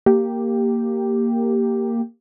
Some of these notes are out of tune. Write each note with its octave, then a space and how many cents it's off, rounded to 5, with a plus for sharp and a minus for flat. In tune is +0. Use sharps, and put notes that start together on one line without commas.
A#3 -5 G4 +0